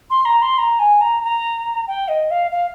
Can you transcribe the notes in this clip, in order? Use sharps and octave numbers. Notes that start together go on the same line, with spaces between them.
C6
A#5
C6
A#5
G#5
A#5
A#5
G5
D#5
F5
F5